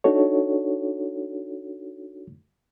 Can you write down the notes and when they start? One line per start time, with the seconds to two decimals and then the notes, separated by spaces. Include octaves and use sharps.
0.04 D4 D#4 F#4 A4 C#5